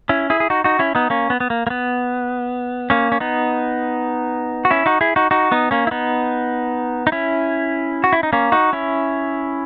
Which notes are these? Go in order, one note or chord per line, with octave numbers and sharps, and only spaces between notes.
C#4 E4
E4 G#4
G#4
D#4 F#4
D#4 F#4
C#4 E4
B3 D#4
A#3 C#4
B3
B3
A#3
A#3
B3
A#3 C#4
C#4
B3 D#4
F#4
C#4 E4
D#4 F#4
E4 G#4
D#4 F#4
D#4 F#4
B3 D#4
A#3 C#4
E4
B3 D#4
D#4
C#4 E4
F#4
E4
D#4
A#3 C#4
D#4 F#4
C#4 E4